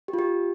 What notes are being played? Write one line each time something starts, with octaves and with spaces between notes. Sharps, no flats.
G4
F4
G4